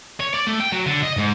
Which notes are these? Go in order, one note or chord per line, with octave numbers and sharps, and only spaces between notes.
C#5
D5
A3
G5
F#3
D3
D#5
G#2